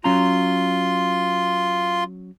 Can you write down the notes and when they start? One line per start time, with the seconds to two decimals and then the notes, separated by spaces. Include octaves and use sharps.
0.04 F#3 C#4 F4 A#5 C6